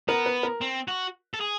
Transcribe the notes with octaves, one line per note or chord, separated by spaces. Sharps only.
B3 A#4
B4
A#4
C4
F#4
A4
G#4